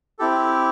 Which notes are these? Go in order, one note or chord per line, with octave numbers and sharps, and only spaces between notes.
C4 E4 G4 A4